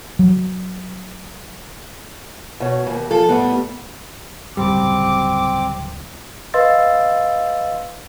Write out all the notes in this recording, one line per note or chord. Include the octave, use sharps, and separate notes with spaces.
F#3
B2 C#5
D#2 G#2
F3 A4
A2 G3 B3
D1 G2 C#3 G3 C4 D6
B4 D#5 F5 C6 E6 A6